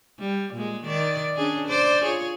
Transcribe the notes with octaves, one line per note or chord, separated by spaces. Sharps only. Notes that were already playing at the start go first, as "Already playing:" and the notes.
G3
A#2 G#3
D#3 D5
C#4 D4 G#4
C5 D5
F4 G#4 C#5